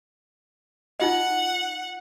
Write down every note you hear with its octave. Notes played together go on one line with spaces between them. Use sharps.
D#4 F4 D#5 F#5